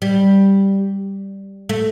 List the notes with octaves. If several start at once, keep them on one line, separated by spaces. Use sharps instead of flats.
G3
A3